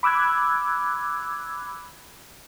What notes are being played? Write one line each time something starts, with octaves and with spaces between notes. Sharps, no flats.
B5 D6 E6 F#6 G#6